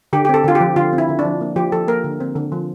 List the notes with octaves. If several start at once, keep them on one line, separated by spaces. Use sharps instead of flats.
D3 G4
G4
C4 A4
D3 F4
G4
F3
D3 F4
C4
E4
D3
D4
F3
A#3
F3 G4
F3 A4
A#3 A#4
D3
C4
D3
F3